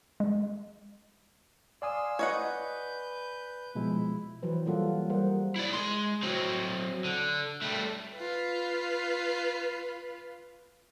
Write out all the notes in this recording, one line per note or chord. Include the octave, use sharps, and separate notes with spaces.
G#3
D5 F5 G#5 C6 D#6 E6
B4 C#5 D#5 F#5 G6
B2 F3 G#3 E4
E3 F#3 B4 C5
G3 A#3 F4 A4 F#5
G3 G#4 A#4 C5 F#5
E4 D5
G#3 C6
F#3 C4
D3
G3 A3
F4 B4